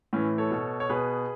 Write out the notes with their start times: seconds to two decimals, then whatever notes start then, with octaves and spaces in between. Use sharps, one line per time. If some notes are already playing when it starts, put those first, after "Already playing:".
0.13 A2 E3 C#4
0.38 A4 C#5
0.51 B2
0.80 C#5
0.90 B2 G#4 B4